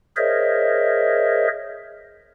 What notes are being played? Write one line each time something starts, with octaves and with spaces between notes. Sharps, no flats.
G#4 A#4 C5 C#5 D#5 E5